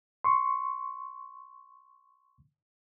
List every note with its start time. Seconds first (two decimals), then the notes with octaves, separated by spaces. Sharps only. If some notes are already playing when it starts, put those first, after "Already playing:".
0.24 C6 C#6